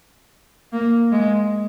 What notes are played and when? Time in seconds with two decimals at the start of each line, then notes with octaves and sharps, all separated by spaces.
0.73 A#3
1.12 G#3